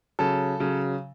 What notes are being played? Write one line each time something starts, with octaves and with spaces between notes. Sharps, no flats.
C#3 F#3 A4
C#3 F#3